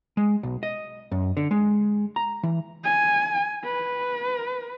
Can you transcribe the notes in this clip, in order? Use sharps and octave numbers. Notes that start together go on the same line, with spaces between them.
G#3
B1
D#5
F#2
D3
G#3
A#5
E3
G#5
B4